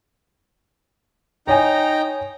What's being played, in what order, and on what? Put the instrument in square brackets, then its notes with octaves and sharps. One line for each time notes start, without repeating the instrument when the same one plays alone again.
[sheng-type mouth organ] D#4 G5 A#5 [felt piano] C#5 G#5